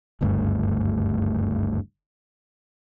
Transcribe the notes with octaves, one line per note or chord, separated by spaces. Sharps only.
F#1 D2 G2 A3